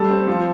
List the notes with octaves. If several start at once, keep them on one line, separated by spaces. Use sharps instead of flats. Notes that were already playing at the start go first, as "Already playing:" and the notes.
Already playing: G3 A3 A4
C4
F3